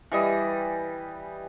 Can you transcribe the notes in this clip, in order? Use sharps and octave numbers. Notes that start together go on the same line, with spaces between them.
E3 G3 D#5